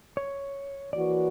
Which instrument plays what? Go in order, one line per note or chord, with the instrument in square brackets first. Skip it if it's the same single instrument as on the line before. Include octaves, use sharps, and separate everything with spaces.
[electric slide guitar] C#5
[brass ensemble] E3 A#3 C#4 F#4 B4 [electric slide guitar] D5